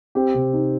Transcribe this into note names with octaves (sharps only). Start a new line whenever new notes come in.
C4 G4
C3
D#4